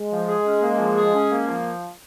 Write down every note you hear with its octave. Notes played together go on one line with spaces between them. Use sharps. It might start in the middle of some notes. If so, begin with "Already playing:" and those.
Already playing: G#3
F3
G#4
C#4
A#3
F3
G#4
C#4
A#3
F3